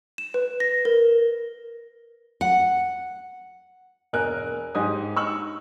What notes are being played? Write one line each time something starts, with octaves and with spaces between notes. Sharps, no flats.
E7
B4
A#6
A#4
F#5
E1 A#4 G#5 F#6
G#2 G4 D#5 G#5 D#6
D#4 C#6 E6 F#7